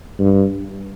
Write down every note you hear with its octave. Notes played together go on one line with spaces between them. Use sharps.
G2